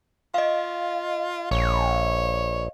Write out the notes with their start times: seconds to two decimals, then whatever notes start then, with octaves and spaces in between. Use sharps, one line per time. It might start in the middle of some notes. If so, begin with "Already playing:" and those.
0.34 F4 D#5 F5
1.51 A#1 C#5